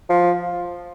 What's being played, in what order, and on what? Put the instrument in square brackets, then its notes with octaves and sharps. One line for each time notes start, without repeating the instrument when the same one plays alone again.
[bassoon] F3